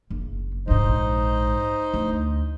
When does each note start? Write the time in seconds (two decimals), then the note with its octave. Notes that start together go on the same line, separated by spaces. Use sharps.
0.10 F#1
0.68 A#1 G#2 D#4 C5 D#5
1.94 D2